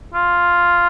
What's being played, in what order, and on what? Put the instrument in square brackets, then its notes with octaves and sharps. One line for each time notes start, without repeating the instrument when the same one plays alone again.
[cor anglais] F4